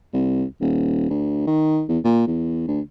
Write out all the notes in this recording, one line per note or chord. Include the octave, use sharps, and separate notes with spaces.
C2
D#1
D2
D#3
E2
A#2
E2
D2